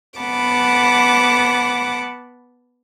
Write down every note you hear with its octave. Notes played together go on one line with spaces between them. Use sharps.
B3 F#5 A5 B5 D6